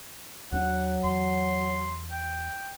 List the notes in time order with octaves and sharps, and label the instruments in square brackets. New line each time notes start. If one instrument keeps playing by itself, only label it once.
[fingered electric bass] D#2 B3 D4 [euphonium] F#3 [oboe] F#5
[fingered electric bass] E2 [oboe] C6
[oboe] G5